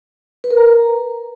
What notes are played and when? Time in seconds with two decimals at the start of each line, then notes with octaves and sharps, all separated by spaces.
0.44 B4
0.51 A#4
0.57 A#5